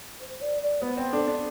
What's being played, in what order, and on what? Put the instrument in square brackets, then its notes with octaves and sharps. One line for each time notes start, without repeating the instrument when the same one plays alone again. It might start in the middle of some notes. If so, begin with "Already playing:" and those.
[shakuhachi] C5
D5
D5
[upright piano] B3 [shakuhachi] C5
[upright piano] C4
[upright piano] D4 [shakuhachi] A4
[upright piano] D4